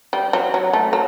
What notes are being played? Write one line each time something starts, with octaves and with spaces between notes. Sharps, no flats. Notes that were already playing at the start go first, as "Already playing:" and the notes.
G3
F#3
F#3
A3
F#3